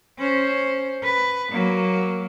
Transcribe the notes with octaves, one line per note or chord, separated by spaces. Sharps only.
C#4 C5
B4
F#3 A#3